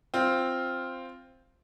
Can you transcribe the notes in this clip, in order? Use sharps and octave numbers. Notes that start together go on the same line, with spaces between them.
C4 F4